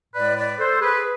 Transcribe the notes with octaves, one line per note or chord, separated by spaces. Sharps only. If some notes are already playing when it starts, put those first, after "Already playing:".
A2 G#3 B4 D5
B4 D5
A4 C5
G#4 B4